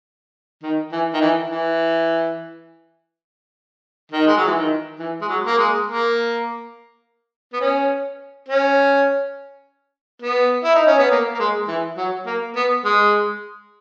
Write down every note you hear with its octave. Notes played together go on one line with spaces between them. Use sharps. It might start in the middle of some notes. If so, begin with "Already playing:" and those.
D#3
E3
D#3
E3
E3
D#3
G#3
F#3
E3
D#3
E3
G#3
F#3
A#3
G#3
A#3
B3
C#4
C#4
B3
E4
D#4
C#4
B3
A#3
A#3
G#3
E3
F#3
A#3
B3
G#3